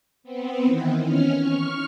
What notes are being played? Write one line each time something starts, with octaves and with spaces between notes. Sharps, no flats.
B3 C4
D#3 E3
C#4 F6
C#6 F6